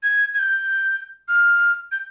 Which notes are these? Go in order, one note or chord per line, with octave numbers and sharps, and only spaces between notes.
G#6
G#6
G6
F6
G6